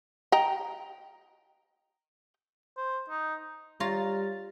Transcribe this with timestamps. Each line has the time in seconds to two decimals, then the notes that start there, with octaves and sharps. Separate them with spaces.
0.32 D#5 G5 A#5
2.77 C5
3.10 D#4
3.80 G3 F4 C#5 A#5 A6